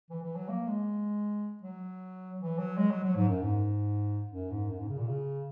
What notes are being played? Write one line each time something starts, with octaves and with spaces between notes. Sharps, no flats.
E3
E3
F#3
A#3
G#3
F#3
E3
F#3
G#3
F#3
F#3
G#2
F#2
G#2
F#2
G#2
F#2
G#2
C#3
A#2
C#3